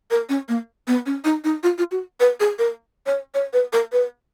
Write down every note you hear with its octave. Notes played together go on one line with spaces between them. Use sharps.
A#4
C#4
A#3
B3
C#4
D#4
D#4
F4
F4
F#4
B4
G#4
A#4
C#5
C#5
B4
A#4
B4